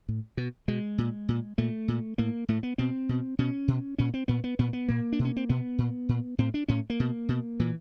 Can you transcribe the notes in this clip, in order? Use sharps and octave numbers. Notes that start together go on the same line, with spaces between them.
A2
B2
B2 G#3
A#2
A#2
A#2 A3
A#2
A2 A#3
A2 A3
B3
B2 C4
B2
B2 C#4
B2
A#2 C#4
C4
A#2 B3
B3
A#2 B3
B3
A#2 A#3
D4
B2
C#4
C4
B2 B3
A#2
A#2
A2 C4
D4
A2 C#4
A#3
B2
B2
A#2 E3